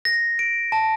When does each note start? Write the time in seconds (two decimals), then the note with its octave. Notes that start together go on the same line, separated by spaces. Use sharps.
0.05 A#6
0.39 D7
0.72 A5